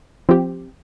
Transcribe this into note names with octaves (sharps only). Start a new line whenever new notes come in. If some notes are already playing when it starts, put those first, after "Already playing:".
F3 C4 G4